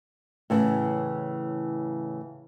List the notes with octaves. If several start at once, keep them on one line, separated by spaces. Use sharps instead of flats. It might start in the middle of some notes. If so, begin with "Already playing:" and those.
A2 C#3 E3